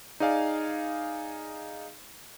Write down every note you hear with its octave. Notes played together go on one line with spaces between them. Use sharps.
D#4 G#4 D5 F5 G#5